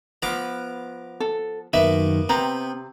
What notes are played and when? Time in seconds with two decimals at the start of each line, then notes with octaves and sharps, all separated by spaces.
0.22 F3 B3 A#5 D6
1.20 A4
1.73 F#2 D#3 A#3 B3 E5
2.29 C3 B3 C4 G5 A#5